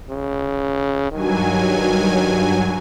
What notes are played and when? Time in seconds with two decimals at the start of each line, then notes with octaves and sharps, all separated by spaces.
0.10 C#3
1.12 G2 D#3 F#3 G#5